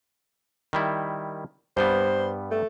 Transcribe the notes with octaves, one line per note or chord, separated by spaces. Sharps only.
D#3 G3 E4
G2 G3 B3 C5
A3